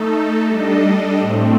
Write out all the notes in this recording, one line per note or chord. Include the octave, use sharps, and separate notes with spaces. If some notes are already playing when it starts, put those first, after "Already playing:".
Already playing: A3 D#4 A4
G3 D4 A4 D#5
A2 A3 C4